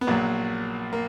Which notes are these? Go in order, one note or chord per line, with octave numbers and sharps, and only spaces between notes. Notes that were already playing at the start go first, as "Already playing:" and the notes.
B3
A#1 A#2 F#3 A#3
A#3